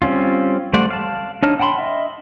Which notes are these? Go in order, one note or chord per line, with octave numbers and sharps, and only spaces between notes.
G3 C4 C#4 F4
G3 A3 C5 D5 F#5
F5 A5
D4 D#4 C#5 A5 F6
F#5 G5 A5 B5 C6
D#5 E5